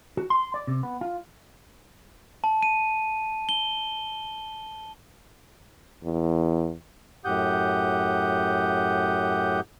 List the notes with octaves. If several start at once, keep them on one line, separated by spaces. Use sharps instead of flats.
F#4
C6
D5
C3
B3
F4
A5
D#7
G7
E2
F#2 A2 G4 F#5 D#6 G6